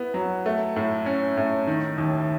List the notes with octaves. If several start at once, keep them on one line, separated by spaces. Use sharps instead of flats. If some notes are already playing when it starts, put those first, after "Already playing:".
Already playing: B3 E4
F#3
A3
A2
C#4
A2
D#3
D#2